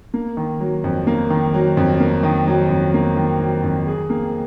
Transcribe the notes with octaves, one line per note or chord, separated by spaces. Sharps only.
A#3
D#3
F#3
F2
A#3
D#3
F#3
F2
A#3
D#3
F#3
F2
A#3
D#3
F#3
F2
G#4
A#3